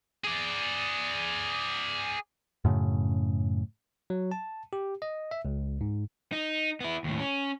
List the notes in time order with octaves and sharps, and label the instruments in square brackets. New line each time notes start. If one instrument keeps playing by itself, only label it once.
[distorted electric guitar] G#4 D5
[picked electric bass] F#2 A2 C#3
[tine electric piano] F#3
A5
G4
D#5
E5
C#2
G#2
[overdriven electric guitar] D#4
B3 E4
D#2 A2
C#4